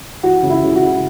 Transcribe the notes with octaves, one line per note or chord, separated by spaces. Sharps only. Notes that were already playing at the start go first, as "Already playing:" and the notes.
E3 F#4
C#3
E4
C#3
F#4
C#3